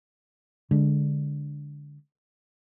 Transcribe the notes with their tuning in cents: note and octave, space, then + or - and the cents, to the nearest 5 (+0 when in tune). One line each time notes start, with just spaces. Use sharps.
D3 -10 G#3 +0 D4 +0